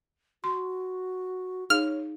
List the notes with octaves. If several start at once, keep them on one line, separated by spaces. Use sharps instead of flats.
F#4 C6
D#4 G#4 C#5 F5 F6